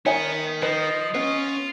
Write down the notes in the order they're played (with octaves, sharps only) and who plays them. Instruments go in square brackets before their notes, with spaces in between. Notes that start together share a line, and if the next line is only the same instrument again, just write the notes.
[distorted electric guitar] B3 [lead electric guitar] D#4 A#4 [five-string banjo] C#5 E5 G#5
[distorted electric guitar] F3 [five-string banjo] B4 [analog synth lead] D#5
[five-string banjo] B3 [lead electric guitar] C#4 C#5 [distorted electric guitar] F4